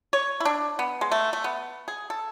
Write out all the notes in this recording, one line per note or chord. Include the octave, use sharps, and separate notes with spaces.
C#5
E4
D4
B3
G#3
A3
A3
B3
G#4
A4